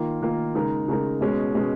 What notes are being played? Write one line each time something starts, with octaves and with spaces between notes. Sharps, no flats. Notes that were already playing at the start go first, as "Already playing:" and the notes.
Already playing: D#3 A#3 F4 A#4
D#3 A#3 F4 A#4
C#3 G#3 D#4 A#4
C#3 G#3 D#4 A#4
B2 G#3 C#4
B2 G#3 C#4